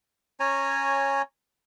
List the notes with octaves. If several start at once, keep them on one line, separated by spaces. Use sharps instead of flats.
C#4 C#5 G#5 A#5